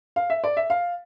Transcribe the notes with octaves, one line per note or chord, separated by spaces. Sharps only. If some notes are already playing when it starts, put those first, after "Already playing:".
F5
E5
D5
E5
F5